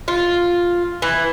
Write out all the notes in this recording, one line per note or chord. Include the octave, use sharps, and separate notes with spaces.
F4
E3